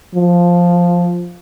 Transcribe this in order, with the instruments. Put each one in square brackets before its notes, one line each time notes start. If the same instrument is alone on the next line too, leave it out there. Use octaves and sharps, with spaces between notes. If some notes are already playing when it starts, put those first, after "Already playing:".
[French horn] F3